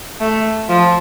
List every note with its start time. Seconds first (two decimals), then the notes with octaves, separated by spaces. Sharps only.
0.21 A3
0.69 F3